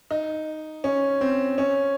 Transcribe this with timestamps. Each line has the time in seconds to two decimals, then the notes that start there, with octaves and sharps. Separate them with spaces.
0.11 D#4
0.84 C#4
1.21 C4
1.58 C#4